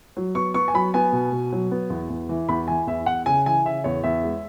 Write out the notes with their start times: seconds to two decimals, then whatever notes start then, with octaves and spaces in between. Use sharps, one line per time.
0.17 F#3
0.35 B3 C#6
0.54 B3 C#6
0.68 G#5
0.74 F#3 B5
0.94 B3 G#5
1.12 B2
1.32 B2
1.52 F#3
1.71 B3
1.90 E2
2.10 E2
2.29 E3
2.49 E2 B5
2.68 E3 G#5
2.87 E2 E5
3.06 E2 F#5
3.26 C#3 G#5
3.46 E3 G#5
3.65 C#3 E5
3.84 E2 C#5
4.04 E2 E5
4.24 G#3